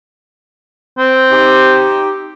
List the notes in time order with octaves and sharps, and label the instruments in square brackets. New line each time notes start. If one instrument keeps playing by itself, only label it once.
[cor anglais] C4
[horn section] D#4 G4